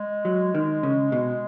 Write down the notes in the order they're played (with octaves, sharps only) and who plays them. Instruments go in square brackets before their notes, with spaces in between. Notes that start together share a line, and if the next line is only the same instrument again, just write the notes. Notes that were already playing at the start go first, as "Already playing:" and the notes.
Already playing: [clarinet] G#3
[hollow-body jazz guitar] F#3
D#3
C#3
B2